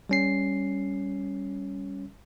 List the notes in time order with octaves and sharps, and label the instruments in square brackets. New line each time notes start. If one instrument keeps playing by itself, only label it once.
[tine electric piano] G3 C#4 C7